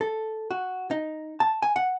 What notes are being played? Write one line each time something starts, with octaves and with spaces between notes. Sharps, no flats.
A4
F#4
D#4
A5
G#5
F#5